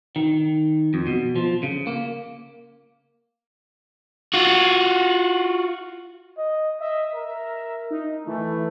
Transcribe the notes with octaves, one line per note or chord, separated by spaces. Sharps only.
D#3
F2
B2
F3
C#3
A#3
F4 F#4
D#5
D#5 E5
A#4
D#4
E3 A3